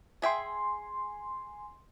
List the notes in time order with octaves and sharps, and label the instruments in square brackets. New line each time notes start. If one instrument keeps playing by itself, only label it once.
[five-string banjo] G#4 E5 G5 [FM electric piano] G#5 C6